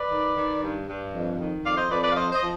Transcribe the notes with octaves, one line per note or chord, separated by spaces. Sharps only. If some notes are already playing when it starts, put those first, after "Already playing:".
Already playing: B4 D5
D#3
D#3
G2
G2
F2
D#3
F2 D5 F5
C5 D#5
F2 B4 D5
B4 D5
F5
F3 C5 D#5
C5 D#5
F3